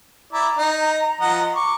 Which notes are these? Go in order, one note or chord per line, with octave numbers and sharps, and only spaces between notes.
E4 D5 A#5
D#4
F3 D#5 F#5
C#6 D6